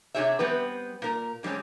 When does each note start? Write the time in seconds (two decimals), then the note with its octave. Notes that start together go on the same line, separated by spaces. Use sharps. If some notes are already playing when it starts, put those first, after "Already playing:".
0.14 C3 D4 G4 G#4 C#5 E5
0.39 G3 B3 C4 B4
1.02 A#2 A#4
1.43 D3 G3 G#3 C4 C#4